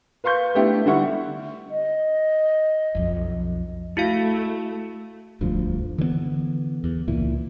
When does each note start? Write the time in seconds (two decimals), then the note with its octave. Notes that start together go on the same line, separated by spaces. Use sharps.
0.24 B4 F5 C6 C#6 G6
0.55 A3 B3 D4 E4 G4
0.86 D3 G3 E4 F#5 C#6
1.71 D#5
2.95 B1 F2
3.97 A3 E4 F#4 F5
5.41 E1 D2 G2 F3
5.98 D3 E3 A3 B3
6.84 E2
7.08 C#2 A#2 E3